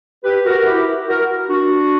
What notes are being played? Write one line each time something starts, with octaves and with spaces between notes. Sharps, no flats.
G4 B4
F#4 A#4
E4 G4
F#4 A#4
D4 F#4